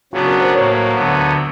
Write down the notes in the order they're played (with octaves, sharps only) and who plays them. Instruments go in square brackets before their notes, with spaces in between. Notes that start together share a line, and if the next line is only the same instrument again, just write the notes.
[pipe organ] C#3 F#3 B3 D4 [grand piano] F#4
[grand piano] A#4
C5
[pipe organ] A2 F#3 A#3 [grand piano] C#5
[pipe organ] D2 D3 F#3 B3